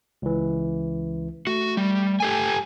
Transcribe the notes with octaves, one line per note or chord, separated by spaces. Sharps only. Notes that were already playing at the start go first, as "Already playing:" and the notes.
C#2 E3
A3 F#4
G3
G4 A4 G#5